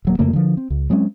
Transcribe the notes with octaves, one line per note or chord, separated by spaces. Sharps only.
D#1 F#3 A#3
F2 C#3 A3 A#3
D3 F3
C4
C#2
F#3 G#3 C4 C#4